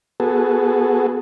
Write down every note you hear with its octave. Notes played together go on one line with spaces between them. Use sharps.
B3 F#4 G#4 A4